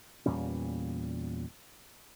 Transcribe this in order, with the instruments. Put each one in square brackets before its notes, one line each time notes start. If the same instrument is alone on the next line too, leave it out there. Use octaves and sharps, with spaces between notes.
[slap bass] E2 A#2 G3 C#4